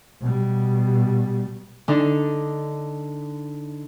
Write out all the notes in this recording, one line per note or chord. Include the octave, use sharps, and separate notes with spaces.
B2 G3
D3 D4 D#4